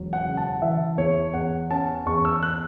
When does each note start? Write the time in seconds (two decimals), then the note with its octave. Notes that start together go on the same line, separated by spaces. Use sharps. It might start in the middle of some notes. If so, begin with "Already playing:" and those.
Already playing: E1 F#3
0.13 F#5
0.26 C#3
0.37 A5
0.62 E3 E5
0.97 E2 C#5
1.34 E2 F#5
1.70 C#4 A5
2.06 E2 C#6
2.25 E6
2.43 F#6